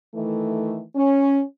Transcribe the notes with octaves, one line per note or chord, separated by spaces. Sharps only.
D#3 E3 A3
C#4